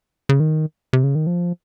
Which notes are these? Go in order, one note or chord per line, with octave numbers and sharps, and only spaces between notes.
C#3
D#3
C3
C#3
D#3
F3